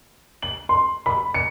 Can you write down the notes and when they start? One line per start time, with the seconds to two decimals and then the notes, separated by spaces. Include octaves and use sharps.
0.42 F#7
0.69 C6
1.06 B5
1.34 C#7